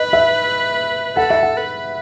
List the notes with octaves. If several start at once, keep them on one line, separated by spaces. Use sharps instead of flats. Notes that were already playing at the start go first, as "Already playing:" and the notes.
Already playing: B4 D#5
E5
A4 F#5
E5
F#5
B4